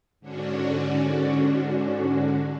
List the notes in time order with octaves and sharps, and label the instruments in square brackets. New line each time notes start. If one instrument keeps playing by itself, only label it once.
[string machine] G#2 D3 C#4 D4 F#4